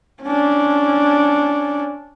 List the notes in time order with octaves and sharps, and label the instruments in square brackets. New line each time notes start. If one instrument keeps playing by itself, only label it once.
[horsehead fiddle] C#4 D4